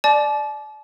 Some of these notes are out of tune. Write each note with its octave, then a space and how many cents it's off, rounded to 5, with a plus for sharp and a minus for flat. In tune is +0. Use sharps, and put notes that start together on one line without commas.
D5 +15 A5 -40 D6 +0